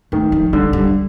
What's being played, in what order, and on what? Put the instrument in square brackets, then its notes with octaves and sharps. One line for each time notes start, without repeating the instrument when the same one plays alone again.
[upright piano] D#3 [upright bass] A3
[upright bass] F3
[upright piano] D3 [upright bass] G3
[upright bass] G3